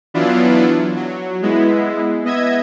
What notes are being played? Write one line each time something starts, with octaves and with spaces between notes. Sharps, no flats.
E3 F#3 B3 D4 E4 F4
F#3
G#3 B3 E4
B3 D#5 E5 G#6